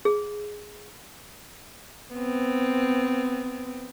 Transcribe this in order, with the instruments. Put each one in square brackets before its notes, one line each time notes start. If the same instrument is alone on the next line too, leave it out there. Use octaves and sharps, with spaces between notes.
[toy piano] G#4
[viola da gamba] B3 C4